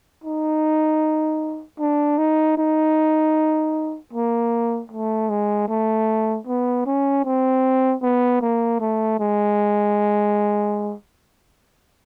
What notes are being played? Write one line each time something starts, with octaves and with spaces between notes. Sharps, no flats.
D#4
D4
D#4
D#4
A#3
A3
G#3
A3
B3
C#4
C4
B3
A#3
A3
G#3